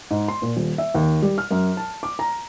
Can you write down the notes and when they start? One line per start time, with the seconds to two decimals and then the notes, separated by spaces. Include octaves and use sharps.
0.11 G#2
0.28 C6
0.42 A#2
0.57 D#1
0.78 E5
0.95 D#2
1.22 G3
1.38 F6
1.51 F#2
1.77 A5
2.03 D6
2.19 A#5